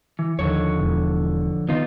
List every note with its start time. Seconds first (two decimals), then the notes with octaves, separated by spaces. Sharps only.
0.19 E3
0.39 D#2 D3 D#3 F3 C#5
0.78 E1 E2
1.69 D#3 B3 D#4 F4